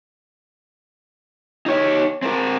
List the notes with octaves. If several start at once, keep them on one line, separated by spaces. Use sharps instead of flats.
D#4 C#5
C4 A#4